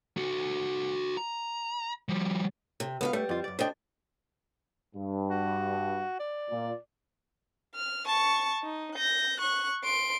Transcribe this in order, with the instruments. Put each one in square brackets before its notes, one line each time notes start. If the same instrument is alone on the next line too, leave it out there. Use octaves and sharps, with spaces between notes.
[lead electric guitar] F#4 A4
A#5
F3 G3
[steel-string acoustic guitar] C3
[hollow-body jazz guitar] C#2 [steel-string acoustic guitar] B3 F#4 F5
[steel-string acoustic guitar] G3 [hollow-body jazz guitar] A3
[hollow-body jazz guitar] F2 F4
F#2 D5
[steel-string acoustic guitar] C3 D4 [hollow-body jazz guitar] C5 D#5 G5
[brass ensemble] G2
[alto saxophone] F#4
D5
[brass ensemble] A#2
[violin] F6
A5 C#6
D#4
G6 A#6
C#6 F#6
C6 D7